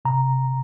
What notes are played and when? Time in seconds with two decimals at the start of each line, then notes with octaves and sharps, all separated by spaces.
0.05 C3 A#5
0.47 C3